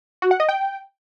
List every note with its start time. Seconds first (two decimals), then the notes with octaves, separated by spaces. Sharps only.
0.22 F#4
0.31 F#5
0.40 D#5
0.49 G5